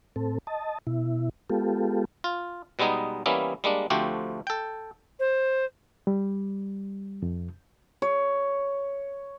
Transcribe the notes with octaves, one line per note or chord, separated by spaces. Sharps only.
A2 C4 A4
D#5 A5
B2 E4
G#3 B3 F4 G4 A4
F4
B2 G3 G#3 B3 D#4 G#4
E3 G3 A#3 B3 C#4 E4
G3 G#3 A#3 D4
D2 F3 A3 C4 F#4 G4
A4 G5
C5
G3
F2
C#5